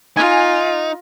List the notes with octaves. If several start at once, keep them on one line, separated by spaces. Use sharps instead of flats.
D#4 F4 G#5